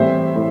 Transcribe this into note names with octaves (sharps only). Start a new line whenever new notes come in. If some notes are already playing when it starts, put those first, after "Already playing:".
Already playing: A2 E3 G3 C4 C5 E5
A2